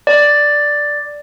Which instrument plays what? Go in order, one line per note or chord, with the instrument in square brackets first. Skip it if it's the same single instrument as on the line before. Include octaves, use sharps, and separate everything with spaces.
[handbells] D5